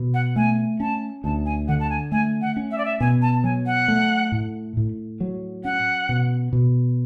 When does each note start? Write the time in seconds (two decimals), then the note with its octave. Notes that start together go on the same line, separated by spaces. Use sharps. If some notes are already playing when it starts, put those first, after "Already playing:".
Already playing: B2
0.14 F#5
0.36 A3 G#5
0.80 C#4 A5
1.24 D2 A5
1.46 G#5
1.68 D3 F#5
1.80 A5
1.90 G#5
2.12 A3 G#5
2.42 F#5
2.57 C#4
2.71 E5
2.78 D5
2.85 E5
3.00 B2 G#5
3.22 A5
3.44 F#3 G#5
3.66 F#5
3.88 A3
4.32 A2
4.77 A2
5.20 F#3
5.64 C#4 F#5
6.09 B2
6.53 B2